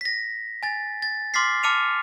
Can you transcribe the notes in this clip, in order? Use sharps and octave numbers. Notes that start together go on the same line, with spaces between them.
A#6 B6
G#5 A6
A6
C6 D6 F6 A6 B6 C7
A5 D6 F6 C#7 D#7 F7